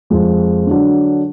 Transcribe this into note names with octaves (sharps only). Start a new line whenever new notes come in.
F2 F3 G#3
D3 F#3 D4